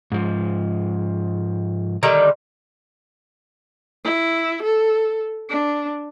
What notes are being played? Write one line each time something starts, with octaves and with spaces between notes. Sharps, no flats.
G#2 F3
D3 D#3 G3 D#5 A#5
E4
A4
D4